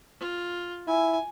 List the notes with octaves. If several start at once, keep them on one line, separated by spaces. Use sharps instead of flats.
F4
E4 G#5